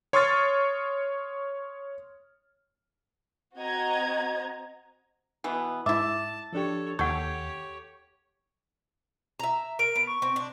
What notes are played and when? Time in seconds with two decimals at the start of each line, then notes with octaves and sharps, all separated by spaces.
0.13 C#5 C6 C#6 D#6 F6 A6
3.56 C4 F#4 D#5 A#5 G#6
5.44 B2 E3 B3
5.86 G#2 E4 E5 A5 D6
6.53 F3 D4 G4 A4 C#5
6.99 D#2 G4 A4 C#5 F#5 C#6 G6 G#6
9.39 E5 A#5
9.79 A#4 D7
9.96 B3
10.07 C#6
10.22 C4
10.36 D4